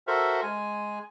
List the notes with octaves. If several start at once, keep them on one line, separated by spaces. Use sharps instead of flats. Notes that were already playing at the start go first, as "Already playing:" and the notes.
F#4 A4 A#4 C5 E5
G#3 G#5